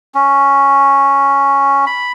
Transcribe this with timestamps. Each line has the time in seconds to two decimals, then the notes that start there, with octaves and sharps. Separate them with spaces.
0.14 C#4
1.86 B5